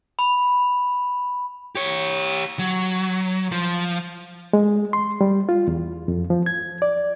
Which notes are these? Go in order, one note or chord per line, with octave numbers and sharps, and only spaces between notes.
B5
G4 C#5
F#3
F3
G#3
C6
G3
F4
E2
F2
F3
G#6
D5